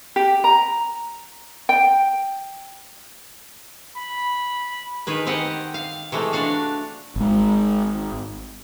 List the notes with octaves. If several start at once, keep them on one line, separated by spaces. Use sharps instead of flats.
G4
A#5
G5
B5
D#3 G#4 B4
C4 G4 D#5 F#5
F5
C3 E3 G#3 A3
D4 F#4 F5
G#1 G#3